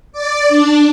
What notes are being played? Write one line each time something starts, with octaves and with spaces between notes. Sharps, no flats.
D5
D4